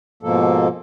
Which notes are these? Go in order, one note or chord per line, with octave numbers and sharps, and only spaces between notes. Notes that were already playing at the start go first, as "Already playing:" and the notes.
G#2 B2 F3 A#3 A4